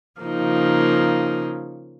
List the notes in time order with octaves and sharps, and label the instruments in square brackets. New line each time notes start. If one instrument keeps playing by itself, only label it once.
[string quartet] C#3 F3 A#3 D#4